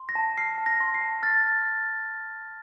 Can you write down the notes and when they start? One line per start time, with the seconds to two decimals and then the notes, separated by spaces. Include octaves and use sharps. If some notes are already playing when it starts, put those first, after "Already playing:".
Already playing: C6
0.09 A#6
0.15 A5
0.38 F6 C7
0.58 A5
0.66 A#6
0.80 C6
0.94 C7
1.01 A5
1.23 F6 A6